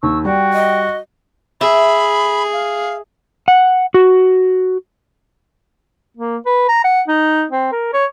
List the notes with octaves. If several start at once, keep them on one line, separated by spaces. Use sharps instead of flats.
D#2 C#6 E6
G3 F#4 G5
D#5
G#4 E5 B5
F5
F#5
F#4
A#3
B4
A#5
F#5
D#4
C4
A#4
C#5